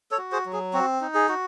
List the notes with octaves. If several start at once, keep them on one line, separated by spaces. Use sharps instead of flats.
A4 C#5
F#4
G#4 C5
F#3
G#4
C4 F#4
D#4
G#4
F#4